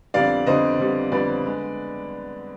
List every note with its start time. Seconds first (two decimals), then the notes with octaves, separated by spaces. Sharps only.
0.14 F2 D3 G3 B3 D5 F5
0.46 F2 D3 G3 B3 C5 D#5
0.79 F2 D3 G3 B3
1.12 F2 D3 G3 B3 B4 D5
1.45 D3 G#3 B3